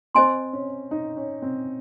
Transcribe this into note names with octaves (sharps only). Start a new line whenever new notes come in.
C4 C5 D#5 G#5 C6
C#4
D#4
C#4
C4